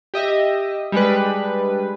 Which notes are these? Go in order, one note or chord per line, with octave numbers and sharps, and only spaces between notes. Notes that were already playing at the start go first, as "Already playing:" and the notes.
G4 D#5 E5
G3 G#3 D4 B4